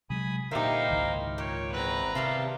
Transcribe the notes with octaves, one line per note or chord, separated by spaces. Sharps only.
C3 F#3 G#3 G#5 B5 D#6
A#2 D3 D#4 E4 G4 A#4 C5 F5
G#1 C#2 D#3
A#2 C#5 G5
E2 C4 B4 A#5 F#6
C3 D#3 G3 E4 F5 A5 C6